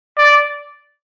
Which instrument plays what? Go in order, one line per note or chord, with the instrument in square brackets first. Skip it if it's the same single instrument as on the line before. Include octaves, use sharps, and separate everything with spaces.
[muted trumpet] D5